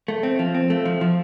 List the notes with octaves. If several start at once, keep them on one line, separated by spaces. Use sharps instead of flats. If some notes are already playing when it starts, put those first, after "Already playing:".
A3
C4
F3
C4
A3
F3
F3